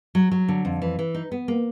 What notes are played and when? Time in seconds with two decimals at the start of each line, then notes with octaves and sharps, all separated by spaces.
0.15 F#3
0.31 F#3
0.48 D3
0.65 F2
0.82 E3
0.99 E3
1.15 D#4
1.32 B3
1.48 A#3